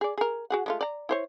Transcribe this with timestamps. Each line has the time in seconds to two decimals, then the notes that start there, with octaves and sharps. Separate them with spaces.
0.01 G#4 D5
0.18 G#4 A#4
0.50 F#4 G#4 F#5
0.66 G#3 A3 F4
0.81 D5 A#5
1.09 E4 C5 C#5